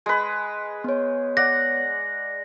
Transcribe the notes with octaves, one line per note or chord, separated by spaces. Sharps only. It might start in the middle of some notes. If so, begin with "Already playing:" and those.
G#3 B4
B3 C#5
D5 F#5 A#6